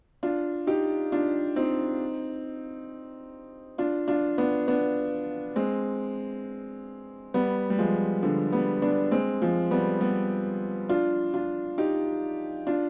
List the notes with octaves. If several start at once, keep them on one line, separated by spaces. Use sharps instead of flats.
D4 F4
D#4 G4
D4 F4
C4 D#4
D4 F4
D4 F4
B3 D4
B3 D4
G#3 C4
G3 B3
G3
F3 G#3
D3 F3
G3 B3
B3 D4
G#3 C4
F3 G#3
G3 B3
G3 B3
D4 F4
D4 F4
D#4 G4
D4 F4